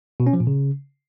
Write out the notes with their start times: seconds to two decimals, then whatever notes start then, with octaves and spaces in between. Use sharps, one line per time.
0.20 B2
0.27 C#4
0.33 F3
0.40 A#2
0.47 C#3